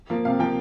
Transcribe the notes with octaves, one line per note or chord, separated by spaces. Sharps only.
F3 A#3
C3 F5
F3 A#3 G5